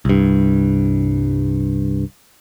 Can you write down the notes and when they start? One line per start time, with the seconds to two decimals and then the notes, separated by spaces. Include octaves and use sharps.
0.05 C2 G2